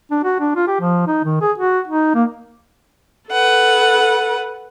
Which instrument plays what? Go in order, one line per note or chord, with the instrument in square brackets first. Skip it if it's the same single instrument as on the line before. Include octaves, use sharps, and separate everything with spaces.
[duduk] D4
F#4
D4
F4
G4
F3
D#4
D#3
G#4
F#4
D#4
A#3
[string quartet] A4 B4 F#5